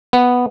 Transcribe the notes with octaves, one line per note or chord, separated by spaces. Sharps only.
B3